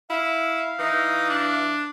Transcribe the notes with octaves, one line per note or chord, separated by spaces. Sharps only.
E4 F5
E3 D#4
D4